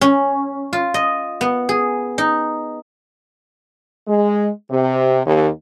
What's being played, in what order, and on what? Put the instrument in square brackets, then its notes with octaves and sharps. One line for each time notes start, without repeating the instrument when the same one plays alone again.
[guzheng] C#4
F4
D#5
B3
G#4
D#4
[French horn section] G#3
C3
D#2